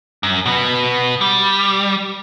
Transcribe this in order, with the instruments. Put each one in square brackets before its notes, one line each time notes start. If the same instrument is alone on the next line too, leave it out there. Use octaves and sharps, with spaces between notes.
[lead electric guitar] F#2
B2 B3
G3